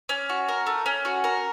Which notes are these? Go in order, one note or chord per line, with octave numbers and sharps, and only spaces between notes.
C#4
F#4
A#4
A3
C#4
F#4
A#4